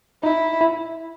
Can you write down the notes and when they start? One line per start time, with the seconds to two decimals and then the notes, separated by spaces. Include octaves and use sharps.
0.23 D#4 E4
0.61 E4